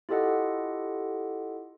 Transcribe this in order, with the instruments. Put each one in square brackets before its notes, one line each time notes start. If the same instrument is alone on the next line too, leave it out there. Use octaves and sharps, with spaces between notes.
[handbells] E4 F4 G4 A4 D#5 F#5